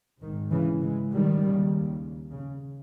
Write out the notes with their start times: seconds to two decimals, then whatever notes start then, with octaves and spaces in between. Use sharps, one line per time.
0.22 G#1 G#2 D#3
0.52 C#3 E3
0.81 E3 G#3
1.12 D#3 G3
1.42 D#2 C#3
2.31 C#3